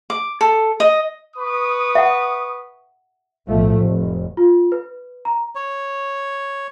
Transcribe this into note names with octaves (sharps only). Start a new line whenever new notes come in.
D6
A4
D#5
B4 C#6 D#6
E5 F#5
B1 A2 F3 A3
F1
F4
B4
A#5
C#5